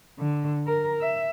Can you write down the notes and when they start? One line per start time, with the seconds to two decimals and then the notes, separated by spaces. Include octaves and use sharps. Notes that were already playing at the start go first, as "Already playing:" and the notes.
0.19 D3
0.67 A#4
1.01 E5